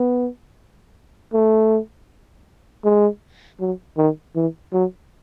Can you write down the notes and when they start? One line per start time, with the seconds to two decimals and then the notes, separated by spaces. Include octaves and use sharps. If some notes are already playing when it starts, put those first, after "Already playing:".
Already playing: B3
1.33 A3
2.85 G#3
3.60 F#3
3.97 D#3
4.35 E3
4.73 F#3